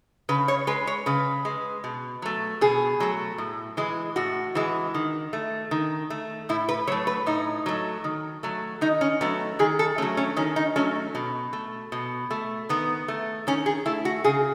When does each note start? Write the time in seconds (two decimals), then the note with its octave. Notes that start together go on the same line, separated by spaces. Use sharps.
0.29 C#3 B4
0.48 C#5
0.67 G#3 B4
0.87 C#5
1.06 C#3 B4
1.45 G#3
1.84 B2
2.22 F#3 A3
2.61 B2 G#4
3.00 F#3 A3
3.38 A2
3.77 E3 G#3
4.16 A2 F#4
4.55 E3 G#3
4.94 D#3
5.33 A3
5.71 D#3
6.10 A3
6.49 A2 E4
6.69 B4
6.87 F#3 C#5
6.92 A3
7.07 B4
7.26 A2 D#4
7.66 F#3 A3
8.04 D#3
8.43 F#3 A3
8.81 D#3 D#4
9.01 C#4
9.21 F#3 A3 B3
9.59 D#3 G#4
9.79 A4
9.98 A3 C#4
10.02 F#3
10.17 C#4
10.37 D#3 C#4
10.56 D#4
10.76 F#3 A3 C#4
11.15 B2
11.53 A3
11.92 B2
12.31 A3
12.69 D#3 B3
13.08 A3
13.47 D#3 C#4
13.66 G#4
13.86 A3 E4
14.05 F#4
14.24 C#3 G#4